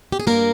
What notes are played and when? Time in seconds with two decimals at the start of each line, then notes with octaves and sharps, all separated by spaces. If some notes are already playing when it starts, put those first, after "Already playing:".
0.12 G4
0.20 G#4
0.27 G2 A#3 A#4